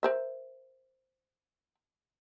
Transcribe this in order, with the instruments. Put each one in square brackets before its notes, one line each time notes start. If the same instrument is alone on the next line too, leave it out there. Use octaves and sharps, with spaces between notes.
[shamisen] A#4 C5 E5